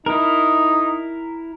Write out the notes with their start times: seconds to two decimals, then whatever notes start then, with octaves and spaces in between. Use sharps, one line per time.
0.06 D#4 E4 A#4